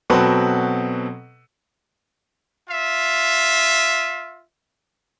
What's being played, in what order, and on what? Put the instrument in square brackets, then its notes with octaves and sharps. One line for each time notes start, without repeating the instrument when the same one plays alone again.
[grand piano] B2 F#3 C4 A4 B4
[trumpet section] F4 E5